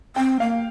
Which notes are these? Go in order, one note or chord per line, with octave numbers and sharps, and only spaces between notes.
C4 G5
A#3 F5